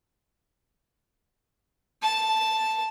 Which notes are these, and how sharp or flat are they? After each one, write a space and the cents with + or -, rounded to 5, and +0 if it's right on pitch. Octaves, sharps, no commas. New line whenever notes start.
A5 +0